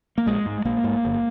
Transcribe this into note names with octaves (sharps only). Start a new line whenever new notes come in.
A#3
A#1 G#3
G#2
A#1 A#3
G#2
G1